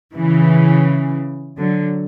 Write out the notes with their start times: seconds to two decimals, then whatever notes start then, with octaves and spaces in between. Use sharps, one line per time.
0.16 C#3 E3
1.57 D3 F#3